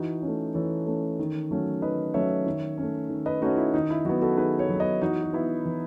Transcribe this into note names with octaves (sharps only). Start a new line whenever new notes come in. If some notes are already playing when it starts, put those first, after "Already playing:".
Already playing: E3 D#4 F#4
C#4
A3
E3 A4 C#5
A3 C#4
D#3
F#3 A3 C#4
D#3 B4 D#5
F#3 A3 C#4 C#5 E5
D#3
C#4
A3
D#3
B4 D#5
A3 C#4 D#4 F#4
E4
D#3 D#4
E4
F#3 B3 D#4 F#4
F#4 A4
D#3 G#4 B4
A4 C#5
F#3 B3
B4 D#5
E3 D#4 F#4
F#4
B3 E4
E3